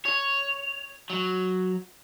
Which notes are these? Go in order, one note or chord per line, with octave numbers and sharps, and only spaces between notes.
C#5
F#3